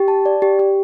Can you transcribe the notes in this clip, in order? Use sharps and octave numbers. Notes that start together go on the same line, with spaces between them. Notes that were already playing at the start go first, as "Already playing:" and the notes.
Already playing: G4
A5
D5
G4
G4